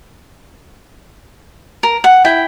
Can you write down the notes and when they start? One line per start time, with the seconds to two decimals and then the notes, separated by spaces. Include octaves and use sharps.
1.83 A#4
2.04 F#5
2.25 E4 G5